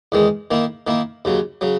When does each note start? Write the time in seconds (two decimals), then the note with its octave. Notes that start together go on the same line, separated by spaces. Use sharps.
0.12 E2 D#3 G#3
0.51 D#3 A#3 E4
0.87 D#3 A#3 E4
1.25 D#2 C#3 F#3
1.61 C#3 F#3